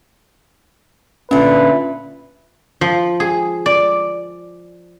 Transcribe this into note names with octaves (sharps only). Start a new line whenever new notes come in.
A#2 D3 C#4 B4 E5
F3
G#4
D5